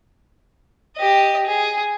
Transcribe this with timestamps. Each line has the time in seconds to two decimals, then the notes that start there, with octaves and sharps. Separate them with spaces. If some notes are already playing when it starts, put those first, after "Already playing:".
0.97 G4 D#5
1.46 G#4